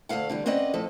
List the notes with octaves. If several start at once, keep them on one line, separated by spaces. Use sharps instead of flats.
D2 F#3 A4 F5 F#5
D3 E3 G3
C4 C#4 B4 D5 D#5 F#5
A2 F3 A4